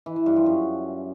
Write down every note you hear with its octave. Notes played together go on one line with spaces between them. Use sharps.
E3
E3
G2
F3
F#2